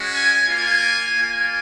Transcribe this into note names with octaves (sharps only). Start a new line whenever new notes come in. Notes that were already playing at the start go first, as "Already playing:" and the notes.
Already playing: G#3 C#4 F#4
G#5
A#3 F4 G#5
A#3 F4 G#5